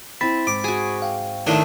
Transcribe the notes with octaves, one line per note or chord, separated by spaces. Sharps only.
C4 E4 C5 B5 A6 B6
G#2 D6
F#4 G#4
F5 G5
A2 D#3 A3 D4 E5